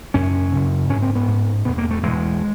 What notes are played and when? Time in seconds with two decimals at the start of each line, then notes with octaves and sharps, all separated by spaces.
0.14 F#2 C#3 C#4
0.52 F#2 C#3
0.90 G#2 C#4
1.02 C4
1.15 B3
1.28 G#2
1.65 E2 B2 B3
1.78 A#3
1.91 A3
2.03 E2 B2 G#3